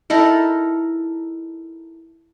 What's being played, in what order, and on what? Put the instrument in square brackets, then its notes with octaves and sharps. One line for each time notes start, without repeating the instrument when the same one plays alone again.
[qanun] D#4 E4 A4 A#4